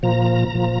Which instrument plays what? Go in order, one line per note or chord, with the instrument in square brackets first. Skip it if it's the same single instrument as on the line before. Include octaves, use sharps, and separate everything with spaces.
[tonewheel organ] A#2 F3 A#5
A#2 F3